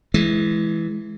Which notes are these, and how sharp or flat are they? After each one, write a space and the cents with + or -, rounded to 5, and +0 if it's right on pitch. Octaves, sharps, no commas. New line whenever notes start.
E3 +0 G#3 +25